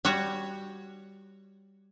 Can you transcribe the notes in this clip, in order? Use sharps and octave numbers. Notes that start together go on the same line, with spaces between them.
G3 F#4 C#5 F#5